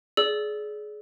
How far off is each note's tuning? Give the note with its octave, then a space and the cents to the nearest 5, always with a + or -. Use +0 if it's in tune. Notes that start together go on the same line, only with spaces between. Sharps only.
G#4 +25 D5 -20 E6 +0